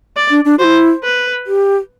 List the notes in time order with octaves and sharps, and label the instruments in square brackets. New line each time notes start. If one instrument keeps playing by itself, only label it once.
[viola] D5
[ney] D4
D4
[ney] E4 F#4 [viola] C5
[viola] B4
[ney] G4